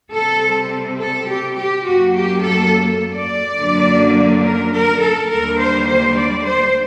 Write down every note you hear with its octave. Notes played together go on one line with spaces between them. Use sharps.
C3 G3 C4 A4
A4
G4
G4
F#2 F#3 A#3 F#4
G4
A4
D5
F#2 D3 F#3 A#3
A#4
A#4
A4
D#2 D3 G3 A#3 A#4
C5
C5
D5
C5